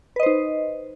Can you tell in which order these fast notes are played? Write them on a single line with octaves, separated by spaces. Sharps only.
B4 D#5 C5 D#4